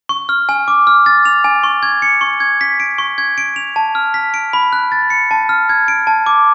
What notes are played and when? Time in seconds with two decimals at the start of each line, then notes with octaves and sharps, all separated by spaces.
0.09 C#6
0.29 F6
0.49 G#5
0.68 D6
0.87 F6
1.06 A6
1.26 F7
1.44 G#5
1.63 C#6
1.83 G#6
2.02 C#7
2.21 C#6
2.40 G#6
2.61 B6
2.80 D7
2.98 C#6
3.18 G#6
3.38 D7
3.56 F7
3.76 A5
3.95 F6
4.14 B6
4.34 D7
4.53 B5
4.73 F#6
4.92 A6
5.10 C#7
5.31 A5
5.49 F6
5.69 G#6
5.88 D7
6.07 A5
6.26 D6